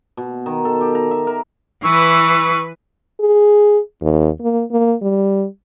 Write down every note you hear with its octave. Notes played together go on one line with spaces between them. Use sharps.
B2
D#3
A4
G4
A#5
E5
A#4
E3 B4 C#6 E6
G#4
D#2
A#3
A#3
G3